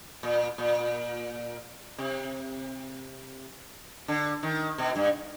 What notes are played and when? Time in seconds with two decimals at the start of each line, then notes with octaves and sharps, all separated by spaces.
0.23 A#2
0.58 A#2
1.98 C3
4.08 D3
4.43 D#3
4.78 B2
4.96 G2